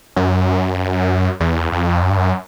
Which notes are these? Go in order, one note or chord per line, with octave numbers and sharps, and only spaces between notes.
F#2
E2
F2
F#2
G2
F#2